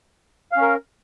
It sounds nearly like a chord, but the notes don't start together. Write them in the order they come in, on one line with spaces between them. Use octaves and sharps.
F5 C#4 A#4